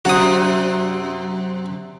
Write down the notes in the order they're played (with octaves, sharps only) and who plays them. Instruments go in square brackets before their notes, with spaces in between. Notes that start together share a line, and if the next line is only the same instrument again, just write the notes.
[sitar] F#2 C3 [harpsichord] F#4 D#6